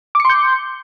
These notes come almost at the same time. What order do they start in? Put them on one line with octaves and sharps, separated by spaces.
D6 C#7 C6 G6